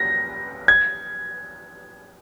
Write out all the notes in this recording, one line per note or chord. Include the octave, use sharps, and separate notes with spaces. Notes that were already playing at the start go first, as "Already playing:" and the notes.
Already playing: A#6
G#6